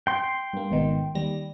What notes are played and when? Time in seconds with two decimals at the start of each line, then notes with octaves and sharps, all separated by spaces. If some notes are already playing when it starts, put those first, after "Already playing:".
0.07 G5 C6
0.53 G2 A#3
0.71 G#1 B2 D#3
1.15 D#2 G3 A#6